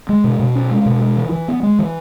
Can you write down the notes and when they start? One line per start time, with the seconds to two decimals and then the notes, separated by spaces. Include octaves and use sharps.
0.09 G#3
0.24 B2
0.40 B2
0.55 C#4
0.71 G#3
0.86 B2
1.01 G#3
1.17 E3
1.32 E3
1.48 B3
1.63 G#3
1.79 E3